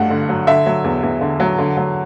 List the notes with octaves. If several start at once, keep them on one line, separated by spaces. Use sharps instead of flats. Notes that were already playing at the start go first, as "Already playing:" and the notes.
Already playing: G2 F#3 A3 F#5
D3
F#3
D3 E5
F#3
E2
E2
D3
F#3
D3
F#3